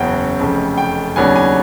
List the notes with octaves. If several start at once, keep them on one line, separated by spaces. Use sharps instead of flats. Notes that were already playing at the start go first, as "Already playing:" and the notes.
Already playing: F#1 E2 C#3 F#3 F#5 G5
F1 F2 C#3
G5
D#2 C#3 F#3 B3 D4 G#5
G#5